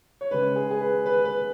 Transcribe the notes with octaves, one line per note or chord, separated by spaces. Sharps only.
C#5
C#3 G#3 B4
G#4
G#4
B4
B4
B4